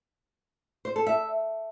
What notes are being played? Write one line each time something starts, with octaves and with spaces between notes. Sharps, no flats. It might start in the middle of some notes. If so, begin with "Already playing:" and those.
C5
A4
E5